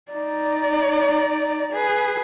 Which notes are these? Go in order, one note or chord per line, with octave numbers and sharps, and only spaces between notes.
D#4 D5
G#4 B4